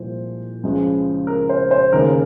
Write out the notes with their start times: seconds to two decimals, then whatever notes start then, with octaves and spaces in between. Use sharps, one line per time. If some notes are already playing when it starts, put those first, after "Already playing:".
Already playing: C2 A#2 F3 G#3 C5
0.63 C#2 C#3 F3 G#3
1.27 A#4
1.49 C5
1.71 C5
1.93 D#2 C#3 G#3 A#4